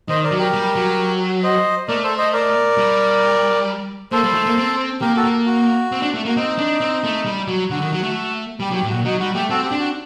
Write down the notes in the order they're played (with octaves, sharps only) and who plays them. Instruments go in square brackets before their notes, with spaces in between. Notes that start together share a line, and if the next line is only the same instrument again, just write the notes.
[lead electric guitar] D#3 [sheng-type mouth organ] C5 D#5
[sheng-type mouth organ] A#4 D5
[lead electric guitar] F#3
[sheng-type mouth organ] G4 A#4
[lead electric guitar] G3
F#3
[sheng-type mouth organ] C5 D#5
[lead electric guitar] A3 [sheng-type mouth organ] A#4 D5
[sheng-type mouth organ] A4 C5
C5 D#5
A#4 D5
[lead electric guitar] G3
[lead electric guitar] A#3 [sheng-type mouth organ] A4 C5
[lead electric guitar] G3
A3
A#3
C4
[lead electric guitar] A#3 [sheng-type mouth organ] G4 A#4
[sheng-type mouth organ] F#4 A4
[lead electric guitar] A#3
[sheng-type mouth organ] F#4
[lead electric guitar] C4
D4
A3
[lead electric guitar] A#3 [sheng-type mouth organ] F#4
[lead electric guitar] C4 [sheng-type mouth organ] D#4
[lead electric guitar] D4
C4
A3
G3
F#3
[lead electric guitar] D3 [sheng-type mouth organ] F#4
[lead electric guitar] D#3
F#3
A3
[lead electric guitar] G3 [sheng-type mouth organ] G4
[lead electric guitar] F#3
[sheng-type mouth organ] G4
[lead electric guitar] A2
[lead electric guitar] A#2 [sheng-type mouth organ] F#4
[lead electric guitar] F#3 [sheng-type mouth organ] D#4
[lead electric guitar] G3 [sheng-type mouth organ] F#4
[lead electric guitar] A3 [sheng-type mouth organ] G4
[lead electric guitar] C4 [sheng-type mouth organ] F#4 A4
[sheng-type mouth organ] G4
[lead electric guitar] D4
[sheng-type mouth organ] F#4